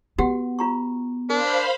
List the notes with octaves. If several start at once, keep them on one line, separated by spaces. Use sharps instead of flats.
B3 F#4 G4 F#5
F4 A#5 C#6
D4 A#4 C5 F5 B5